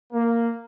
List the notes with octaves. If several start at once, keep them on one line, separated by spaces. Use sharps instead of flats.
A#3